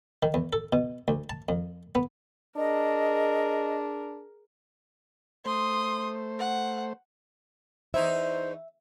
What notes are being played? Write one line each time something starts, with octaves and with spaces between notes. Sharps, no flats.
D#3
E2
A4
B2
D2
A5
F2
B3
D4 G#4 A#4 D#5
A3 C5 C6 D#6
F#5
E2 D#4 E4 C5 E5